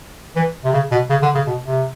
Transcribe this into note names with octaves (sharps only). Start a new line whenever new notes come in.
E3
C3
C#3
B2
C#3
D3
C#3
B2
C3